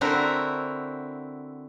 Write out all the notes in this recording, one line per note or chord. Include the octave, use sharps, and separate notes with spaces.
D3 C4 E4 F#4 A#4